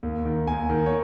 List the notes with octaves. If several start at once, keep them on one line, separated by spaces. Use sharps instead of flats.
D#2
D#3
D#2 G#5
D#3
C#5